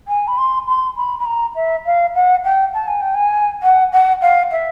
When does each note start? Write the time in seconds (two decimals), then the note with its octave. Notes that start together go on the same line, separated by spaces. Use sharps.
0.08 G#5
0.27 B5
0.38 C6
0.67 C6
0.97 B5
1.19 B5
1.26 A#5
1.55 E5
1.86 F5
2.15 F#5
2.45 G5
2.74 A5
2.87 G#5
3.01 G5
3.15 G#5
3.63 F#5
3.92 F#5
4.22 F5
4.51 E5